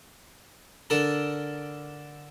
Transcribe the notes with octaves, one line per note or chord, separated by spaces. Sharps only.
D3 D4 A4 A#4